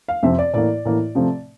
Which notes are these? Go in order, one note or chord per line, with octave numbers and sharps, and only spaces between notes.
F5
F2 C3 F3 C4 E5
D5
A2 E3 A#3 D5
A2 E3 A#3
C3 F3 A3